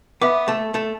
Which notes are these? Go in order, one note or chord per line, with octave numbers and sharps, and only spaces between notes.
B3 B4 E5 B5 D6
A3 A4
A3 A4